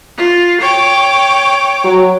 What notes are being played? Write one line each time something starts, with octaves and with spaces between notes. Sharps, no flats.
F4
C#5 G5 D6
F#3